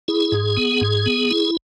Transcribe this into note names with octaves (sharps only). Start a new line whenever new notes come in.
E4 G#4
G#2
B3
G#2
B3
E4